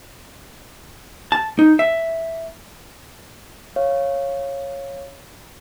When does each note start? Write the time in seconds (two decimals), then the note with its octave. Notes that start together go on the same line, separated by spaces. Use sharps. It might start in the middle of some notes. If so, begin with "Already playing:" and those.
1.32 A5
1.59 D#4
1.79 E5
3.76 C#5 F5